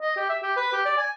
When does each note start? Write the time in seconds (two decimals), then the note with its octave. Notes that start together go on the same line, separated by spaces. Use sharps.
0.01 D#5
0.16 G4
0.29 E5
0.43 G4
0.57 B4
0.73 G4
0.85 D5
0.98 G#5